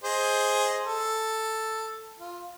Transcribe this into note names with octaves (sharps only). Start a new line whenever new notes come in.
G#4 C5 D#5
A4
F4